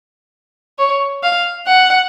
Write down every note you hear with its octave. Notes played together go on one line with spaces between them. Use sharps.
C#5
F5
F#5